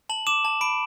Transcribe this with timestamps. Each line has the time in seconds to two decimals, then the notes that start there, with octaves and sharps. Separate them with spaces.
0.09 A5 F#7
0.27 D6 E7
0.45 A5
0.61 B5 D7